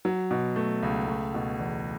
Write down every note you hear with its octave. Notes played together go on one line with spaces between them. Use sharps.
F#3
B2
A3
C#2
A3
B2
E2